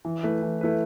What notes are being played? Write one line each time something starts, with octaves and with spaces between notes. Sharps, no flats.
E3
A3 E4 B4
E3
A3 E4 B4